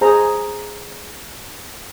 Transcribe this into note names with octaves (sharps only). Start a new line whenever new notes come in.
G#4 C5 A#5